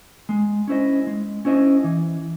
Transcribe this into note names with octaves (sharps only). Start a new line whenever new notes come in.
G#3
C#4 E4 C5 D#5
G#3
C#4 E4 C5 D#5
E3